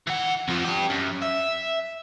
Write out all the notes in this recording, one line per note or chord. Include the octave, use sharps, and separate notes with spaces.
E3 F#5
F2 F3
D4 G4
F#2
E5